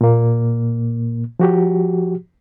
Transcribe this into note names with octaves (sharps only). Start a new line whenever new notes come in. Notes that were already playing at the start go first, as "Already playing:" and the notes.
A#2 A#3
F3 F#4 G4